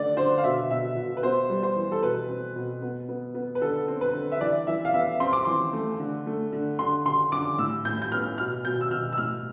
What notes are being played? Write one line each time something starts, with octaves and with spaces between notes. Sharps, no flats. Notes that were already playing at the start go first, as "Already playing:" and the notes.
Already playing: D3 A3 D5
D3 C5
F5
B2 E5
B2 E5
B2
B4
B3 C5
G3
C5
E3
A4
B2 B4
C4
B2
B3
B3
B3
B4
D3 A4
C4
B4
D3
E5
E3 D5
E3 E5
F5
B3 E5
C4 C6
D6
E3 C6
A3
D3
A3
D3
D3 C6
D3 C6
D3 D6
A2 E6
A2 G6
G6
B3 F6
B2 F6
B2 G6
E6
B2 F6
E6
A2 F6